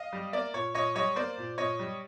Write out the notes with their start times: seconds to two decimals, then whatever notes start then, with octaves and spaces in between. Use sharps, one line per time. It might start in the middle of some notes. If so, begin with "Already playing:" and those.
Already playing: D#5 F5
0.13 G3
0.33 A#3 D5 E5
0.54 A#2 C#5
0.74 A#2 C#5 D#5
0.95 G3 C#5 D#5
1.16 A#3 C5 D5
1.38 A#2
1.58 A#2 C#5 D#5
1.79 G3